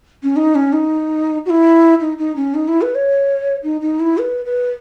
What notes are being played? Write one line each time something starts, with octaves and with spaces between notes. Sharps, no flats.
C#4
D#4
C#4
D#4
F#4
E4
D#4
D#4
C#4
D#4
E4
B4
C#5
D#4
D#4
E4
B4
B4